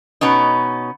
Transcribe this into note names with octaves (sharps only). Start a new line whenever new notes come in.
B2 B3 C#4 D#4